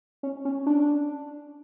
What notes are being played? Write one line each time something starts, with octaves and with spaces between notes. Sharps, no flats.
C#4
C#4
D4